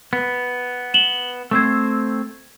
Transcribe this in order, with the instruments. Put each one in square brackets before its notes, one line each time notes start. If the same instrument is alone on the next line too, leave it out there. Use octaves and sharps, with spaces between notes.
[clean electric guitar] B3
[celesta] E7 F#7 G7
[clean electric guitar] A3 C4 C5 [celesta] E6 G#6